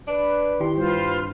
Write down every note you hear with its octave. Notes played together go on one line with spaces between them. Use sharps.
D4 B4
D#3 E4 G4 C6
G2 C4 F4 B4 C5